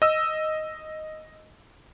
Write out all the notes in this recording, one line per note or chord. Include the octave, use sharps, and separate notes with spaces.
D#5 E6